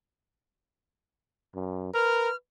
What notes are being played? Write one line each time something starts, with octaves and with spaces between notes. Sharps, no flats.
F#2
A#4 B4 F6